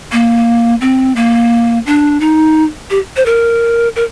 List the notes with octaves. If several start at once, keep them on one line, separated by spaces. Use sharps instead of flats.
A#3
C4
A#3
D4
D#4
G4
C5
A#4
A#4